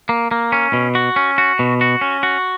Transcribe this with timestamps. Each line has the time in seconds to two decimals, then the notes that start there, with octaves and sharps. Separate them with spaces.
0.09 A#3
0.31 A#3
0.52 C#4
0.73 B2
0.95 F#4
1.16 C#4
1.38 F#4
1.59 B2
1.81 F#4
2.01 C#4
2.23 F#4